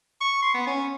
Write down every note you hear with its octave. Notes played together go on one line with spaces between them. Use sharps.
C#6
C6
B3
C#4